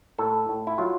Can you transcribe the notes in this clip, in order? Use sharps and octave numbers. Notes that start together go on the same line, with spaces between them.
A2 A4
A2
E4
F#3 F4